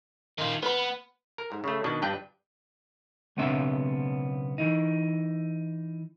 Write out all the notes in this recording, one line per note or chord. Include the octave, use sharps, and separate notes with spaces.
D#3 F4
B3 B4 B5
A#4
G#2
C#3 A3
B2 D#3 D4 B4
G2 D4 B4 G5
B1 C#3 B3 C4 D4 E5
E3 D#4